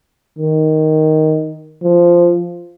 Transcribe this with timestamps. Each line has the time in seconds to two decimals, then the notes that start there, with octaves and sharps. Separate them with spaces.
0.39 D#3
1.83 F3